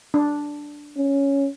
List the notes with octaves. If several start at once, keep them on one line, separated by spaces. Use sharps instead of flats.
D4
C#4